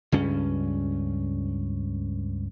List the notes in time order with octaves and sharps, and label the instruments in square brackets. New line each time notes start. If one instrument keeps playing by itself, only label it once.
[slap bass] C#2 G2 C#4